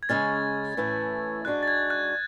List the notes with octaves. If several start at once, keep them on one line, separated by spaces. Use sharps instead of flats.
G#6
C#3 G#3 C#4 A6
A2 E3 A3 C#4 E4
G#2 G#3 D4 F#4 F#6
A6
G#6
F#6